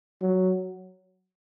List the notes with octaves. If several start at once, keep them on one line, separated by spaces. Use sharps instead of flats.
F#3